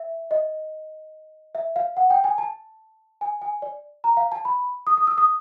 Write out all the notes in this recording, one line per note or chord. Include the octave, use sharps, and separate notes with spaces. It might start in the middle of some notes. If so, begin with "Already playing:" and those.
Already playing: E5
D#5
E5
F5
F#5
G5
G#5
A5
G#5
G#5
D5
A#5
F5
A5
B5
D#6
D#6
E6
D#6